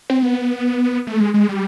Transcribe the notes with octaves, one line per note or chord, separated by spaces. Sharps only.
C4
B3
A3
G#3
G#3
G3